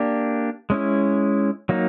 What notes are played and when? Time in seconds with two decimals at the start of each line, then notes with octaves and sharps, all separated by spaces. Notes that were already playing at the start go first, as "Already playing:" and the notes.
Already playing: A#3 D4 G4
0.70 G#3 C#4 E4
1.69 F#3 A#3 D#4